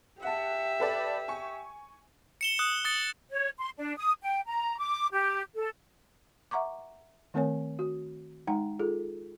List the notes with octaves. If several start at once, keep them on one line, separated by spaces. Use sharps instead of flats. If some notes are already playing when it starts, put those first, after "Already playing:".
G4 E5 F#5 A5
A4 B4 D5
G#5 C#6
C#7 E7 G7
D#6 F#6
D#6 A6 C#7
C#5
C6
D4
D#6
G5
A#5
D6
G4
A4
E5 F#5 A#5 C#6 D6
D#3 A3 C4 A#4 C#5 G#5
F#4
G#3 D#4 F#5 G5 A#5
F4 G#4 A4